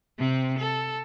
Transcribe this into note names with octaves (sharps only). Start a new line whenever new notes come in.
C3 C4
A4